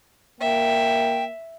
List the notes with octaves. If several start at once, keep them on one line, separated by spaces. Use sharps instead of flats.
A#3 E5 G5